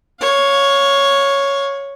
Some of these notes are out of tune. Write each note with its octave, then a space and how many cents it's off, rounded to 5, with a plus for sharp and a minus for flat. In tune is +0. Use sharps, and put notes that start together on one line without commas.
C#5 +0 F5 +30